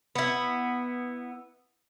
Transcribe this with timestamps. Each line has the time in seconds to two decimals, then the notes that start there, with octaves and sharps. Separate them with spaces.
0.15 B3 E4